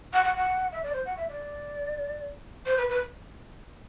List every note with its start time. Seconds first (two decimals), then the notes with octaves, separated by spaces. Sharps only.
0.13 F#5
0.24 F#5
0.36 F#5
0.72 E5
0.83 D5
0.93 C5
1.05 F#5
1.17 E5
1.28 D5
2.66 C5
2.77 B4
2.89 B4